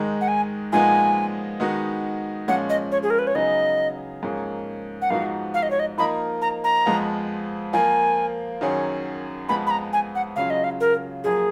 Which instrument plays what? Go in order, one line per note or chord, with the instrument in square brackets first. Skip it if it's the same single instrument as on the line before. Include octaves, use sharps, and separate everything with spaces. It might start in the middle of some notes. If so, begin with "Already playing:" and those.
Already playing: [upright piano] G#2 D#3 G#3 D#4
[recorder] F#5
G#5
[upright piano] A#2 F3 G#3 B3 D#4 [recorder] G#5
[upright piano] D#3 G#3 B3 D#4 F#4
[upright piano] A#2 F3 G#3 C#4 [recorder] F#5
[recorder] D#5
C#5
G#4
A#4
B4
C#5
[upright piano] C#3 F#3 B3 D#4 G#4 [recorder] D#5
[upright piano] G#2 F3 A#3 C#4 G#4
[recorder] F#5
[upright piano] G#2 F3 B3 D#4 F#4 [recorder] F5
[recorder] F5
D#5
C#5
D#5
[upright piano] F3 A#3 D#4 A#4 D#5 [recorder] B5
[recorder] A#5
A#5
[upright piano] F2 F3 G#3 B3 F4
[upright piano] F3 A#3 F4 [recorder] G#5
[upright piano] F#2 D#3 F#3 C#4 G#4
[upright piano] F2 F3 G#3 B3 [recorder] B5
[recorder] B5
A#5
G#5
F#5
[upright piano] C#3 F#3 C#4 F4 [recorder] F5
[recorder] D#5
F5
A#4
[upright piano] F#2 F3 A#3 [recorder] G#4